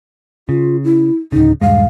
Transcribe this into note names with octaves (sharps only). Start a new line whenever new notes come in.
C#3 F4
E4
D1 C#3 D#4
D#1 G2 G#3 F5